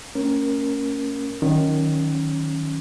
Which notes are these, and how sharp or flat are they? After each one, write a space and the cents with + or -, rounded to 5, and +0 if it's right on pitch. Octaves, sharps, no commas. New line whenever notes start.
A#3 -45 C#4 +0 A#4 +5
D#3 +0 F#3 +0 C#4 -5